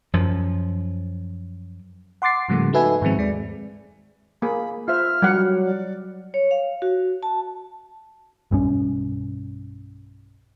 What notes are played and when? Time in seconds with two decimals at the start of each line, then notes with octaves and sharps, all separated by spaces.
0.13 F#2 F3
2.22 F#5 C6 D6 A6 C7
2.48 G#2 C#3 F3 G3 A3 A#3
2.73 D#4 F#4 A4 B4 E5 G#5
3.02 G#2 D#3 F3 G#3 C4
3.18 D#2 G#3 D5
4.42 A#3 G#4 B5
4.88 F4 C5 E5 F6
5.22 F#3 G3 G4 F#5
5.65 D5
6.34 C#5
6.51 F5
6.82 F#4
7.23 A5
8.51 B1 G2 E3 C#4